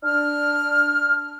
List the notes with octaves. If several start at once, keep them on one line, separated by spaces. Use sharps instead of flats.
D4 F6